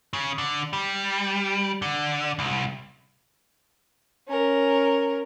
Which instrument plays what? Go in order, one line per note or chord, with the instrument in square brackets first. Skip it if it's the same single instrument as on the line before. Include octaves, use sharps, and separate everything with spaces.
[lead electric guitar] C#3
D3
G3
D3
C2
[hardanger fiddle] C#4 A#4